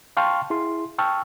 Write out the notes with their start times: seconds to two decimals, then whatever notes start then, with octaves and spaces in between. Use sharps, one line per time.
0.17 F5 G5 A5 C6 C#6 F6
0.50 E4 G#4 C6
0.98 G5 A5 C#6 E6 F6